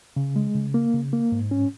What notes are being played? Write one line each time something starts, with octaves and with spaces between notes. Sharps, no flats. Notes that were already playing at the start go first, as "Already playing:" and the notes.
C#3
G#3
C#3
A#3
C#3
A#3
G#2
C#4